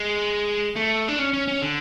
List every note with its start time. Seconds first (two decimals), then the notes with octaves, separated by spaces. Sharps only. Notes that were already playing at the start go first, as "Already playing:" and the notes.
Already playing: G#3
0.76 A3
1.09 D4
1.19 C#4
1.33 C#4
1.48 C#4
1.62 D3